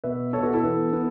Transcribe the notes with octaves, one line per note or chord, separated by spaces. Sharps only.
B2 B3 B4 E5
B2 B3 A4 C#5
F#4 B4
E4 A4
E3 B3
B3